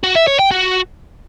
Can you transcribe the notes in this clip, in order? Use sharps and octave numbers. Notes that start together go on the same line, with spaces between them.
F#4
E5
C#5
G5
F#4